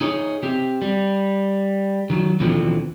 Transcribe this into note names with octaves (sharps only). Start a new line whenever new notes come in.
D#4 G#4 C#5 D#5
C4 G4
G3
D#3 F#3
D#2 B2 D3 E3 F3 C4